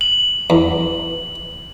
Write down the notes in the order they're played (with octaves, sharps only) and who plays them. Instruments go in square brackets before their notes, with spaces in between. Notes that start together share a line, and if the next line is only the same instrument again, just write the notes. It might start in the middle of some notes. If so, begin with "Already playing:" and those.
[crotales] F#7
[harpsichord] E2